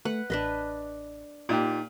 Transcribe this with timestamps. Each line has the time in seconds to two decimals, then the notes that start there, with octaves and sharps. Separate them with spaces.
0.05 A3 B4 F#5
0.30 A1 D4 B4 D#5
1.49 A#2 D#4 G4